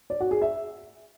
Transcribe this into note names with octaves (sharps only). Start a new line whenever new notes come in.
D5
F#4
G#4
E5